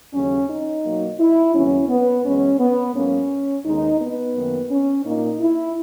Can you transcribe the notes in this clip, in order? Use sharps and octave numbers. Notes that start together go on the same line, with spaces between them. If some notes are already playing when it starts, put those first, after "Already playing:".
D#2 C#3 F#3 C#4
D#4
B2 F#3 A#3
E4
D#2 C#3 F#3 B3 C#4
B3
F#2 E3 G#3 B3 C#4
B3
G#2 F#3 A#3 C#4
D#2 D#3 G#3 B3 D#4
B3
F#2 D#3 A#3
C#4
A#2 A#3 D#4
E4